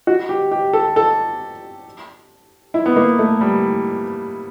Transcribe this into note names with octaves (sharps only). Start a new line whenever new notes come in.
F#4
G4
G4
A4
A4
E4
B3
A#3
A3
G3